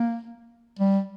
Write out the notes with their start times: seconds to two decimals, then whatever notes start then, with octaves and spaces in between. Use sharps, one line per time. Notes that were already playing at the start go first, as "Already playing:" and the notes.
Already playing: A#3
0.79 G3